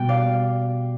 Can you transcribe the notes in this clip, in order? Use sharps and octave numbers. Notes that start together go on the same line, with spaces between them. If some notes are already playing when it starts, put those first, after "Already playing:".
Already playing: B2 G3 B3 G5
D5 F5